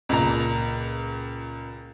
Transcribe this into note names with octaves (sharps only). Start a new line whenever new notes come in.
C#2 A#2 A#5